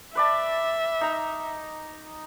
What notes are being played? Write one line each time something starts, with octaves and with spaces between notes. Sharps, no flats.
B4 D5 E5 A5
D#4 A#5